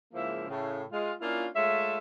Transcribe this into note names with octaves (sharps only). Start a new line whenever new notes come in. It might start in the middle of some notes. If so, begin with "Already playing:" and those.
G#2 C#3 F3 A#3 E4 E5
A2 C#3
G#3 F4
A#3 C#4 D4 E4 F4
G#3 A3 F4 C#5 E5